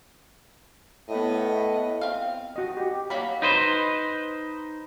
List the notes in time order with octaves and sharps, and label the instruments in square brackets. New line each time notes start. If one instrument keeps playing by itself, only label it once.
[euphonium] A2 [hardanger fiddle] B3 D#5
[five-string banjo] C4 F5
[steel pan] F#4 D#5
G4
[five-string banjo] D#3 F#3 A#3 [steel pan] F5 B5
[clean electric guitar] D#4 B4 C5